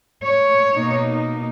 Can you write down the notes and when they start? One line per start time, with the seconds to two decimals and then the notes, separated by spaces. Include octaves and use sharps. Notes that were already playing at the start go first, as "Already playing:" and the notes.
0.24 C#5
0.73 B2 A#3 D#4